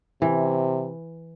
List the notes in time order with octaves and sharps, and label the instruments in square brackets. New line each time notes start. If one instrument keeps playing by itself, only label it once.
[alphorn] C3 [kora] E3